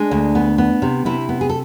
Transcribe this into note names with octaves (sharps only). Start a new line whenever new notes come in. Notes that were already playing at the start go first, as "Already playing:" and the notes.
Already playing: G#3 D4
D2
B3
B3
C3
C3 E4
B3
G#4
A4